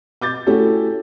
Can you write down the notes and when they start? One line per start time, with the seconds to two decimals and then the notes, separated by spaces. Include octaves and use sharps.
0.21 D6 G6 A6
0.47 A3 C#4 E4 F#4 G4 A4